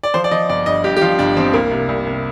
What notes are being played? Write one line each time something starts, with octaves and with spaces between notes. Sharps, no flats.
D5
F3 C5
D5
F3 D#5
G1 D5
G2 D#5
G2 G4
G4
F3 F4
G1 D4
F3 C4
C2 A#3
C3
C2
C3